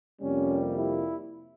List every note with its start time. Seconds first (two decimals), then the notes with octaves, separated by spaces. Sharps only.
0.21 F2 C3 G3 A#3 C#4
0.77 E4